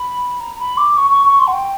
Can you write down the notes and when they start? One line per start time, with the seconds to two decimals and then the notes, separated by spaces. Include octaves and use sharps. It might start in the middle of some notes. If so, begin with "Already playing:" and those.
Already playing: B5
0.40 A#5
0.59 B5
0.77 D6
0.97 C#6
1.10 C#6
1.25 C#6
1.39 C6
1.47 F#5
1.53 G5